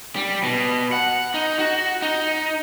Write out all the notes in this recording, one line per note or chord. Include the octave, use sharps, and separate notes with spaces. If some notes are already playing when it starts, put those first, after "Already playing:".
G3
B2
F#5
D#4
F#4
D#4